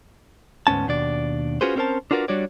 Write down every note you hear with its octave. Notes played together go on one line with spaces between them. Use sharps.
D2 G#2 B3 C#4 A5
D#2 B2 D4 D5
C#4 F4 F#4 G#4 B4 C5
C4 C#4 F4 A#4 C5 A5
D4 F4 F#4 A#4 B4 D5
G3 D4 F#4 C#5 D5